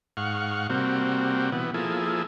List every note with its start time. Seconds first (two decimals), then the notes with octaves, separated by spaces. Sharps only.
0.17 G#2 F5 F#5 C#6
0.70 C3 G3 A#3 C4 F#4
1.52 B2 E3 B3
1.74 F3 A#3 E4 G#4 A4